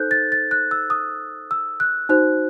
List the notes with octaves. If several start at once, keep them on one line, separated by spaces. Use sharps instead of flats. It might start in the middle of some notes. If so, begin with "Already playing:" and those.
Already playing: D#4 A4 C5 F#6 G6
A6
A6
F#6
E6
D#6
E6
F#6
D#4 F#4 C5 F#6